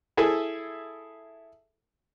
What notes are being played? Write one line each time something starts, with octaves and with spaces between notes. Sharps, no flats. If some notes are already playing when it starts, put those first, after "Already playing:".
E4 G#4 A4 E5